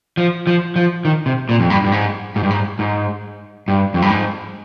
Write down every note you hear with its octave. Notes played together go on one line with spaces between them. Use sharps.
F3
F3
F3
D#3
C3
A#2
F2
G2
G2
G#2
G#2
G2
G#2
G#2
G2
F2
G2
G#2